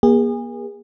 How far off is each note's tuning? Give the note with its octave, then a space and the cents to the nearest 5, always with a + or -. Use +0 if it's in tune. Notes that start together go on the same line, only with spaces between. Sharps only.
A#3 +40 G#4 -30